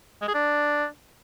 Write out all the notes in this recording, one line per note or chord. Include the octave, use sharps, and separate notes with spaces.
G#3
G#4
D4